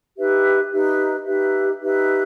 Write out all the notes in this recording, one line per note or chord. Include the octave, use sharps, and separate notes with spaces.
D#4 G4 B4 E5
D#4 G4 B4 E5
D#4 G4 B4 E5
D#4 G4 B4 E5